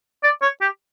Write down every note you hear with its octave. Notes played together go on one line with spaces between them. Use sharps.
D5
C#5
G4